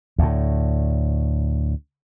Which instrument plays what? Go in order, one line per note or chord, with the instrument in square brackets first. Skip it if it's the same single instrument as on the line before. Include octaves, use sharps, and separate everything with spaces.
[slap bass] D2 A2